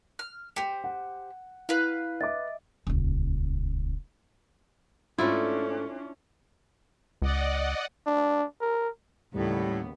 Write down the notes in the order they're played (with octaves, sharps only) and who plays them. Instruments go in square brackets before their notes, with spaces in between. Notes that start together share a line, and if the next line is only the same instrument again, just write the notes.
[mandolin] F6
[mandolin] G4 C5 [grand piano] G5 C#7
[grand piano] F#5
[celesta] E4 [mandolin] B4 F5
[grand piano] D#5 E5 D6 [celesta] A6
[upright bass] D#1 C#2
[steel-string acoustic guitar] G#2 A3 [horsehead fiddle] C#4 D4 [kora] E4 D5 [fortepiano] F4
[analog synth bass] C#2 [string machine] D5 D#5 F#5
[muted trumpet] D4
A#4
[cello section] D#2 C#3 B3 [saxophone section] A2 [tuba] G3